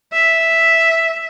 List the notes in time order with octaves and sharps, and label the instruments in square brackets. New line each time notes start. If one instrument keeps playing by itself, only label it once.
[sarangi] E5